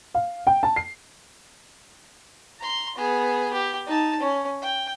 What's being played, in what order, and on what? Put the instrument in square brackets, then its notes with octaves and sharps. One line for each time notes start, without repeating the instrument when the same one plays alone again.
[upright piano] F5
G5
A5
C7
[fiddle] A#5 C6
B3 G#4
G4
D#4 A5
C#4
G5